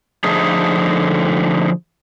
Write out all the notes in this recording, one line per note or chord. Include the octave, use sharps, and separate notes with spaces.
D3 F3 A3 D#4 G#4